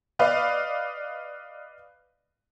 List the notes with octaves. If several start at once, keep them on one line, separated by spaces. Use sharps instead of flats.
B4 D5 D#5 F5